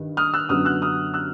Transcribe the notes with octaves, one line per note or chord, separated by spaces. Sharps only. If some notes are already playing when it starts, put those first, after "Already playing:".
Already playing: G2 D#3
D#6 F6
E6 F#6
F#2 D3 F#3 B3 D#6 F6
E6 F#6
D#6 F6
E6 F#6